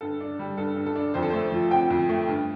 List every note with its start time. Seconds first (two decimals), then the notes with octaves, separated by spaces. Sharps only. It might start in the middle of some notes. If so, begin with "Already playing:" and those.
0.01 G2 A4
0.20 D4
0.39 G3
0.57 G2 A4
0.76 G2
0.86 A4
0.95 D4
1.14 F2 C5
1.23 A4
1.30 A3 C5
1.52 F3
1.71 C4 G5
1.90 F2
2.09 A3
2.28 G2